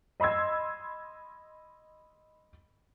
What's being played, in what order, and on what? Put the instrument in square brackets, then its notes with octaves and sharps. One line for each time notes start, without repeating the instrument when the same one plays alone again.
[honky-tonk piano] D#5 B5 C6 E6 G#6